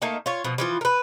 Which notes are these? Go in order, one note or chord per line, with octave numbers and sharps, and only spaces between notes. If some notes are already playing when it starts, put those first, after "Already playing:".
A3 A#3 D#4 A5
F4 C#5
B2 F3
E3 F3 F4
A#4 B4